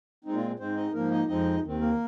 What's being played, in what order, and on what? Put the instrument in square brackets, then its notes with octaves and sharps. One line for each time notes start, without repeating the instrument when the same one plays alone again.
[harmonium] A#2 G#3 C4 D#4
F4
G#2 G#3 C4 C5
D#4 D#5
G#2 F3 A#3 A#4
D#4 D#5
F2 F3 G#3 C4 D#4 D#5
D#2 D#3 C4
A#3 A#4